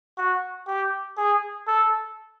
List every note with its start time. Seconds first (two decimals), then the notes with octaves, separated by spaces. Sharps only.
0.18 F#4
0.67 G4
1.17 G#4
1.67 A4